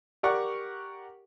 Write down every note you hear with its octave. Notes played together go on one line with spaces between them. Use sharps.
G4 A#4 D5 F#5 C#6